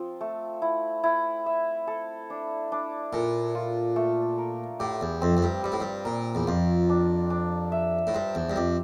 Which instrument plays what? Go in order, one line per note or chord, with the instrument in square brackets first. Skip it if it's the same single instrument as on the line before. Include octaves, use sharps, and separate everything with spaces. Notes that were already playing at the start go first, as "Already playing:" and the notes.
Already playing: [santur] F3 C4
A3
E4
E4
E5
A4
D4
D4
[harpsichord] A#2 [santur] A4
[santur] F4
A3
A#4
[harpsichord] A2 [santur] G4
[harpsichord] E2
[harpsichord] F2 [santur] C4
[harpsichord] F2
G2
[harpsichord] G2 [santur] G3
[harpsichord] A2
G2
[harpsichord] A#2 [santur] A#4
[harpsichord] E2
[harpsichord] F2 [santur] F4
[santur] D4
D4
E5
[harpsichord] A2
[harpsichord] G2 [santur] C5
[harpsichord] E2
G2
[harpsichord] F2 [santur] G4